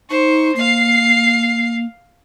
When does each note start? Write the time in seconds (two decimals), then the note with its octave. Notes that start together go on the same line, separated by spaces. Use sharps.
0.10 D#4 C5 C#6
0.56 A#3 F5 C7